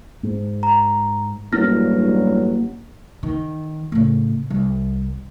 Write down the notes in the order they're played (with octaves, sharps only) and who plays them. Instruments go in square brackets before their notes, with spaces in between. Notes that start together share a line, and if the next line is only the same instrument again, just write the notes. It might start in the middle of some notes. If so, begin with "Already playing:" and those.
[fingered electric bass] G#2
[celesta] A#5
[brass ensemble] A1 G2 F#3 [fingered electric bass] A#3 [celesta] E4 F6 A#6
[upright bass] D#3
A2 C#3
C2